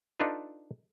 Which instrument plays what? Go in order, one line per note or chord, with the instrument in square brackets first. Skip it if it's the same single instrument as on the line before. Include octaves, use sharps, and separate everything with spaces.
[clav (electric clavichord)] D4 D#4 F4 A4 B4 E5